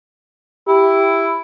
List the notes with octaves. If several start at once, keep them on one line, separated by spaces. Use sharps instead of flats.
E4 G4